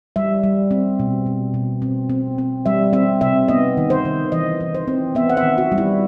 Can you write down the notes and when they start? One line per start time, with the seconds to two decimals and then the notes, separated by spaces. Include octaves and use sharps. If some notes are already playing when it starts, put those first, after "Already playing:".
0.16 G3 E5
0.43 G3
0.71 C4
0.99 B2
1.26 B2
1.54 B2
1.82 C4
2.10 C4
2.38 C4
2.66 G3 E5
2.93 C4 E5
3.21 C3 E5
3.48 B3 D#5
3.77 D#3
3.90 C5
4.05 D#3
4.32 E3 D#5
4.61 E3
4.75 C5
4.88 C4
5.15 B3 E5
5.30 F#5
5.37 E5
5.43 D#3
5.58 F#4
5.72 G3
5.78 E4